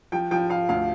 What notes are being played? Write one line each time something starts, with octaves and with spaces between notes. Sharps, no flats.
F3 G5
F3 G5
F3 F5
D2 F5